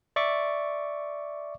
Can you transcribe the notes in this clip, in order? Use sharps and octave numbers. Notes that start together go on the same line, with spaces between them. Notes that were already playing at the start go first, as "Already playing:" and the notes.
D5 E5 C#6 D6